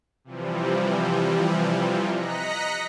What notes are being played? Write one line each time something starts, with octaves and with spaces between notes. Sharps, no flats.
C3 E3 F3 G3
D#5 A#5 F#6 A#6 B6 C#7